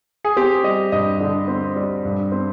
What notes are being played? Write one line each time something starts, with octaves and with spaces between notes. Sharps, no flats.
G#4
C4 G4
G3 D#5
G2 D#5
D3
C4
G3
G2
C4